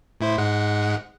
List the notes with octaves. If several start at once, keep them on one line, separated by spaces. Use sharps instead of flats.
A2 E4 C5
G#2 G#3 F#5